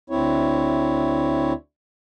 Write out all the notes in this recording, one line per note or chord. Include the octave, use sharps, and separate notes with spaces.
D2 C4 E4 C#5